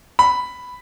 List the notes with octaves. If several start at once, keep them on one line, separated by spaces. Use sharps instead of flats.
B5